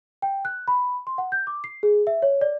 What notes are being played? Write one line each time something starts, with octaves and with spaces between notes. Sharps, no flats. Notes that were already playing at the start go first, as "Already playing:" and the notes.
G5
F#6
B5
C6
F#5
G6
D6
C7
G#4
E5
C#5
D5